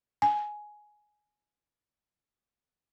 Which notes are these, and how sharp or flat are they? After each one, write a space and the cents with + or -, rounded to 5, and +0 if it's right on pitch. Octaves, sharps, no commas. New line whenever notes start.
G#5 +10